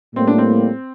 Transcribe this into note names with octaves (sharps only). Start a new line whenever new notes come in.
A2 G3 A#3 C4
D4
C4